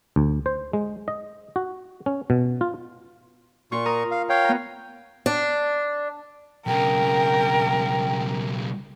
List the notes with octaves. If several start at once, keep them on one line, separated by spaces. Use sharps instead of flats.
D2
C5
G#3
D#5
F#4
C#4
B2
F4
A#2 F4 C#6
A#4 A#5 D#6
F5
C#5 F5 G5
B3 A#5
D4
B1 C#3 A#4 G5